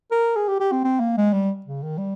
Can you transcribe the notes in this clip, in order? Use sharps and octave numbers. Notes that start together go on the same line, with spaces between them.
A#4
G#4
G4
G4
C4
C4
A#3
G#3
G3
C#3
D#3
G3